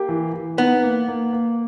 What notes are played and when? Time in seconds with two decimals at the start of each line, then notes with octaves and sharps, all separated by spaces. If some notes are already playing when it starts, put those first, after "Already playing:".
Already playing: A#3 G4
0.09 E3
0.33 E3
0.58 B3 D#4
0.83 A#3
1.08 A#3
1.33 A#3